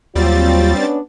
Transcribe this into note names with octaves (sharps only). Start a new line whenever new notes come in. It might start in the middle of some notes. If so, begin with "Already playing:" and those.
D#2 F#3 G3 C4 F4 A6
B3 C#4 D4